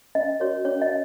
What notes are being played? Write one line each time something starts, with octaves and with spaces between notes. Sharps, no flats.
C#4 D#5
F#4 A#4 C#5
C#4 C#5
D#5